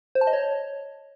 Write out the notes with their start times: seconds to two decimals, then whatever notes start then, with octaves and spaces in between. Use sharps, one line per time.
0.15 C5
0.21 A5
0.27 D#5
0.33 C#5